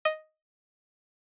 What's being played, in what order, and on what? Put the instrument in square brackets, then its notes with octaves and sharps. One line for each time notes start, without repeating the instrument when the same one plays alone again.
[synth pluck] D#5